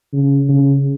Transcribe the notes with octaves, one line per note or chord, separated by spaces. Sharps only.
C#3
C#3